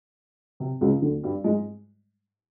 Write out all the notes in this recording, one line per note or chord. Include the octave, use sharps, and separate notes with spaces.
C3
C#2 C#3
D2 D3
G2 G3
G#2 G#3